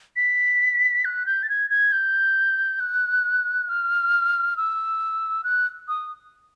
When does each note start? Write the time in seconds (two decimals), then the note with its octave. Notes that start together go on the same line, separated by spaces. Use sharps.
0.16 B6
1.05 F#6
1.26 G6
1.43 A6
1.49 G#6
1.70 G#6
1.92 G6
2.80 F#6
3.69 F6
4.57 E6
5.44 F#6
5.88 D#6